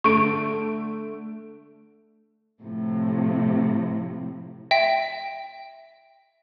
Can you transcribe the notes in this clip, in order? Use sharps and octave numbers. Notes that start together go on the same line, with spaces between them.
D3 A3 C#6 D7
A2 C3 F3
E5 G5 B6